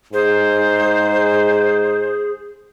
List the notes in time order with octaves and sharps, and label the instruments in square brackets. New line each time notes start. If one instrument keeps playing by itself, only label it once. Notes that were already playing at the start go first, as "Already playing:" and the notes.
[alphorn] G#2 [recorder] G#4 [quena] C5